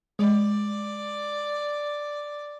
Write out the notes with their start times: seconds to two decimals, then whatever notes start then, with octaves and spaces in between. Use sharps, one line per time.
0.19 G#3 D5